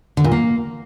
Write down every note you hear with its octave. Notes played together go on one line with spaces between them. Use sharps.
D3
A#2
A#3